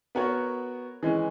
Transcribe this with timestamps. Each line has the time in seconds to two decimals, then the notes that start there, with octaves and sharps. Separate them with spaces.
0.15 B3 F#4 A#4 C#5
1.03 E3 G#3 C#4